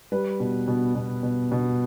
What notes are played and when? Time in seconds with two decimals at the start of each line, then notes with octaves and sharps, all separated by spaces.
0.12 G3 B4
0.40 B2
0.68 B2
0.95 B2
1.23 B2
1.52 B2